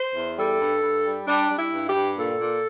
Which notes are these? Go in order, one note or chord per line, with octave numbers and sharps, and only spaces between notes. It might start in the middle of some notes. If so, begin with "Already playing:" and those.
Already playing: C5
E2
G3 A4
G2
G2
G3
G3 D4
G3
E4
G2
G4
G2
A#2 A4
A#2